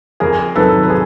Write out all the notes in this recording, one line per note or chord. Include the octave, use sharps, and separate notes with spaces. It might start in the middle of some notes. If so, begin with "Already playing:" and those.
F2 G#4 A#4
C3 D#3 F#3 A4 B4
B4
G#4